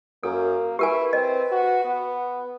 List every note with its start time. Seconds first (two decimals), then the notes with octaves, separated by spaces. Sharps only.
0.23 F#2 A#3 A4
0.79 E4 G4 A#4 B4 G#5
1.13 C4 D#5
1.51 F#4
1.85 B3